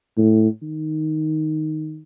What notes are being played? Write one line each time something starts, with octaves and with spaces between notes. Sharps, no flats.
A2
D#3